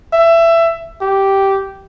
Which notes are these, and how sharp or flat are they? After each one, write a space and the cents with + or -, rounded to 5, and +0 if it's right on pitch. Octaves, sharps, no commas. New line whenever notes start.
E5 +20
G4 -10